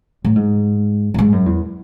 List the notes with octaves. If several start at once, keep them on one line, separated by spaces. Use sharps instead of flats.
A2
G#2
F#2
G#2
F#2
E2